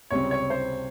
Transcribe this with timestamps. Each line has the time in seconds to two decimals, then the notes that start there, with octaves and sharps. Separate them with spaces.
0.11 C#2 C3 G3 C4 C#5
0.31 C#5
0.50 C5